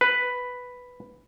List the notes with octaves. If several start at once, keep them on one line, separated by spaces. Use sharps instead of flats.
B4